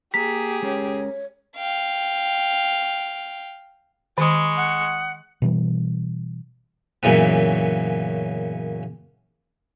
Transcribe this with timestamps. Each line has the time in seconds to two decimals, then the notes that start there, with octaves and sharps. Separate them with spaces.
0.14 A#3 G4 G#4 A#5 B6
0.63 G#3 C#4 A#4 C#5
1.57 F5 G5
4.18 D#3 G#3 B5 C#6 D#6
4.57 F#5 D#6
5.42 B2 E3 G3
7.03 F#2 A#2 C#3 E3 B3